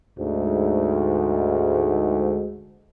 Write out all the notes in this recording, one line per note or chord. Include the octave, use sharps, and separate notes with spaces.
D2 G#2